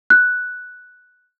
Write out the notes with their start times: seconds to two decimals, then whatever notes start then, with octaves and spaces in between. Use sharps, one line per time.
0.10 F#6